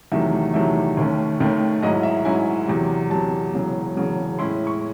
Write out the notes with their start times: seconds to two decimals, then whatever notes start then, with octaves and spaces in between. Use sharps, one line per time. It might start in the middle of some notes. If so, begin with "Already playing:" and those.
0.12 E2 C3 D#3 F#3 A3 E5
0.54 E2 C3 D#3 F#3 A3 E5
0.97 D#2 D#3 A3 C#4
1.40 D#2 D#3 A3 C#4
1.82 G#2 F#3 C#4 E4 D#5
2.03 E5
2.25 G#2 F#3 C#4 E4 G#5
2.67 E2 C3 F#3
3.10 E2 C3 F#3 A5
3.53 E1 E2 C#3 F#3
3.95 E1 E2 C#3 F#3
4.39 A2 G#3 C#4 E4 C6
4.67 C#6